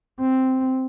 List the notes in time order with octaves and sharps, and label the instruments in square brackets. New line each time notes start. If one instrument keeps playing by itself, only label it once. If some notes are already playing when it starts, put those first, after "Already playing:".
[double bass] C4